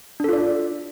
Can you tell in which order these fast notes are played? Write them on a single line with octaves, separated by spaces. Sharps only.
D4 A4 F4 D5